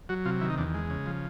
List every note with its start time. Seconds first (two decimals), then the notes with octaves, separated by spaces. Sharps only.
0.09 F#3 F#4
0.25 C3 F4
0.41 D#3 E4
0.50 D#4
0.58 E2 D4
0.74 G#3
0.90 C#3
1.06 F3